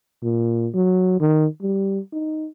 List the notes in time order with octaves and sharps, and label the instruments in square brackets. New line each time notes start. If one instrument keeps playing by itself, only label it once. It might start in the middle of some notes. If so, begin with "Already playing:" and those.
[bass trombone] A#2
F#3
D#3
G3
D#4